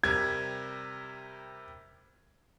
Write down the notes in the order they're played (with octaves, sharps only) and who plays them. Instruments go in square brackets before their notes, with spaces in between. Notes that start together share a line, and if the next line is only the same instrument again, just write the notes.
[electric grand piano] C3 G3 A#4 [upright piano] G#6